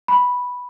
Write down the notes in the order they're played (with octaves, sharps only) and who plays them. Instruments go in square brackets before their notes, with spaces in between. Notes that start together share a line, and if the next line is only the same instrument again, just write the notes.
[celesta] B5